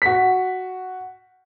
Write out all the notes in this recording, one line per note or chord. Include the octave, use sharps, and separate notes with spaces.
F#4 B6